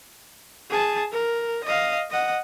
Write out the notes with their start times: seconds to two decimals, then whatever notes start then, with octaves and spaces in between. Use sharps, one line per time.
0.70 G#4 A5
1.12 A#4
1.64 D#5 F5
2.10 D#5 F#5